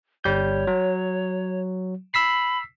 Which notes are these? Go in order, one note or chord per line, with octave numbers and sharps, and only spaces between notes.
G1 G3 C#5 G6
F#3
B5 E6 B6 C7